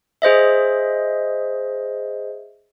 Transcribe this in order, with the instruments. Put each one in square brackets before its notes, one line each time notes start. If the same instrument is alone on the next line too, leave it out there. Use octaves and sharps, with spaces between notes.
[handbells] G#4 C5 D#5 E5